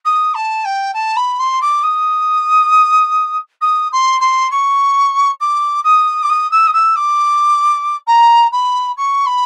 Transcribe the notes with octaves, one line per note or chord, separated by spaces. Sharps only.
D#6
A5
G5
A5
B5
C6
D6
D#6
D#6
C6
C6
C#6
D6
D#6
D6
D#6
E6
D#6
E6
D6
A#5
B5
C#6
B5